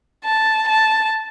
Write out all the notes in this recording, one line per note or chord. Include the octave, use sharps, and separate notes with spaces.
A5
A5